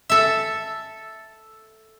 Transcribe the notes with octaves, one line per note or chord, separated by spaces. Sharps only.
A4 E5